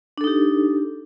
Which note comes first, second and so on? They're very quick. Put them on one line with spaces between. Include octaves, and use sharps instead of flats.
D4 A4 D#4 G4